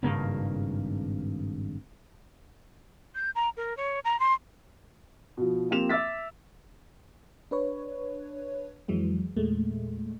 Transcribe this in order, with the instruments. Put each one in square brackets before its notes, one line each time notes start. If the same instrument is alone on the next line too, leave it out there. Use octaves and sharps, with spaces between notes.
[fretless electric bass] G#1 G2 C#3 A#3
[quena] G6
A#5
A#4
C#5
A#5
C6
[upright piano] B2 F3
F3 A#3 C4 G4 E7 F7
E5 D6 E6 A6 B6
[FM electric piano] D4 B4 C#5
F2 E3 F#3 G#3
E2 A#2 G#3 A3